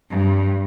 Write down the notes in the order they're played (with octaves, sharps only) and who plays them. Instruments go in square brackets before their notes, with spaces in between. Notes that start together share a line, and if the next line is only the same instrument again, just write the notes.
[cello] G2